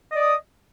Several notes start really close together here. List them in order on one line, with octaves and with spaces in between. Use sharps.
D#5 D5 D#6